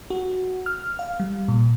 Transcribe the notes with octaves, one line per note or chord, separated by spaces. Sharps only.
F#4
F6
F5
G3
A#2